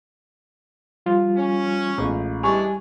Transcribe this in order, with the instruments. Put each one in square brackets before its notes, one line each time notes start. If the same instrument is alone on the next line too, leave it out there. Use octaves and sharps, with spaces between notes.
[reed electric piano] F3 G3 F4
[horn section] C#4
[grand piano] A1 G#3 F4
[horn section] E3 G#3 D4 [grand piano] G3 C#6 F7 [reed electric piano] G#5